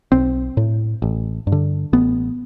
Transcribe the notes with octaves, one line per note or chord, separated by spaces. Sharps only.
B1 C4
A2
A1
G2
D3
A1 B3